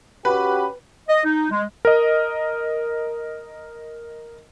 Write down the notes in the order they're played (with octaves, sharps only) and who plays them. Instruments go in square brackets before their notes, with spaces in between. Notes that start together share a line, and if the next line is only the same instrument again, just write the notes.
[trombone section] C#4 F#4 G4 [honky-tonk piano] B4
[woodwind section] D#5
D#4
G#3
[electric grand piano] A#4 D#5